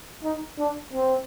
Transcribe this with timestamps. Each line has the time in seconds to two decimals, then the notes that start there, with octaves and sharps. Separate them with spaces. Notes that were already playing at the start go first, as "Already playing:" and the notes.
0.24 D#4
0.58 D4
0.94 C4